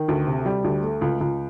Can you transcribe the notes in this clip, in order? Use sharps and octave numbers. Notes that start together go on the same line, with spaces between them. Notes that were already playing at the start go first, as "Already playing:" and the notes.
Already playing: D#3
D2
C3
G3
D2
A3
C#2
C#2